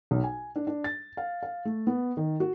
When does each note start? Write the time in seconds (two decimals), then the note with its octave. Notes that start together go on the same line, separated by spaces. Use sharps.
0.11 B1
0.24 G#5
0.56 D4
0.67 D4
0.84 A6
1.17 F5
1.43 F5
1.65 A3
1.87 B3
2.17 D#3
2.40 F#4